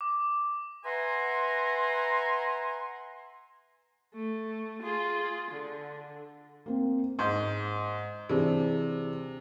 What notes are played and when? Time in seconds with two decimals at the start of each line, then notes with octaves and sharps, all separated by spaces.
0.01 D6
0.85 B4 E5 F#5 G#5 A#5 C6
4.14 A3
4.83 F4 G#4
5.52 D3
6.66 A#3 C4
7.19 G#2 C6 G6
8.29 C3 E3 D4 G#4